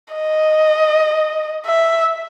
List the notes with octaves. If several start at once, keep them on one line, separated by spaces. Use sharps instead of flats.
D#5
E5